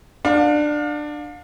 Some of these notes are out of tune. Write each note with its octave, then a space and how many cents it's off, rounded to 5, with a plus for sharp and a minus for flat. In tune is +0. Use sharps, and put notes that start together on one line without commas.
D4 +20 F5 +35